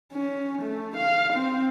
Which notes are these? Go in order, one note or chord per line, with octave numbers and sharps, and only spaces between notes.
C#4
A3
F5
C4